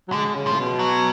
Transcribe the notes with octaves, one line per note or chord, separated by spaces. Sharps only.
F#3
D3 G#3
C#3
F3
A2
B2
F#3